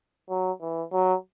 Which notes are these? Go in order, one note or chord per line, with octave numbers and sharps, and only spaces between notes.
F#3
E3
F#3